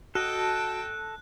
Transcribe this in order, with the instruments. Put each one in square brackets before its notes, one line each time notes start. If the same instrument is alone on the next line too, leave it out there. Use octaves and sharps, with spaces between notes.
[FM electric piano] F#4 [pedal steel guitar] A4 D#5 [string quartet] G5 A5 [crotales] F#6